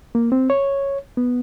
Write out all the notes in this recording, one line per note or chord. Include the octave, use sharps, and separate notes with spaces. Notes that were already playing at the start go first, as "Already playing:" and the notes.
A#3
C4
C#5
B3